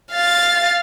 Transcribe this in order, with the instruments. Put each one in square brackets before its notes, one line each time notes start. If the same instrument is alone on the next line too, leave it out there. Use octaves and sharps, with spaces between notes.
[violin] F5 A6